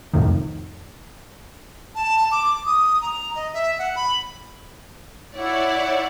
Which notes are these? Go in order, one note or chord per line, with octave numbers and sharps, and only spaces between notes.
C2 F2 A2 D#3
A5
D6
D#6
A#5
D#5
E5
F#5
B5
E4 C#5 D5 F#5